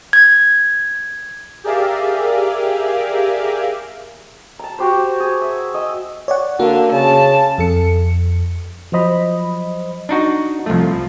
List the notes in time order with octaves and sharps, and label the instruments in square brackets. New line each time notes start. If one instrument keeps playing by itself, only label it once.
[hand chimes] G#6
[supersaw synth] G4 G#4 A#4 D5 E5 F5
[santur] A5 A#5
F#4 G4 C5
G#4
E5
D#5 E6
[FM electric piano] C#5 D5 F#5
[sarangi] D3 [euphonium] A#3 [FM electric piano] F#4
[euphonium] C#3 [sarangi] A5
[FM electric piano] F2 A4 C#7
F3 F#3 C5 D#5 B5
[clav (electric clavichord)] D4 D#4 F#4
[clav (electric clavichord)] C2 A3 [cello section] F3